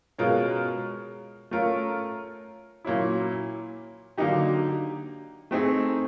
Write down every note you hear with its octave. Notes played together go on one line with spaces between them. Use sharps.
B2 G#3 C#4 F4 A#4
A3 C#4 F4 A#4
A#2 F#3 A#3 C#4 E4
D3 F#3 A#3 D#4 G4
A3 C4 D#4 G#4